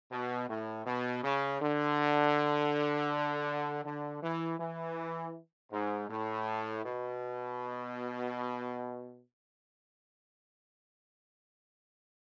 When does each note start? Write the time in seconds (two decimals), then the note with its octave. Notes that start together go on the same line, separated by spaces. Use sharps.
0.11 B2
0.49 A2
0.86 B2
1.23 C#3
1.61 D3
3.85 D3
4.22 E3
4.59 E3
5.72 G#2
6.09 A2
6.85 B2